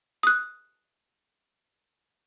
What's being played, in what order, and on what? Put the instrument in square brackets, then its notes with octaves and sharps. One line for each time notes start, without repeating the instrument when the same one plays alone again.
[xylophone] D#6 F#6